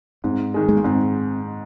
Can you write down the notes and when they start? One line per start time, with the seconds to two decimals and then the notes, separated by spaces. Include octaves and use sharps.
0.24 G#2 C4
0.54 D#3 G#3
0.69 G#3
0.77 A#3
0.84 G#2 C4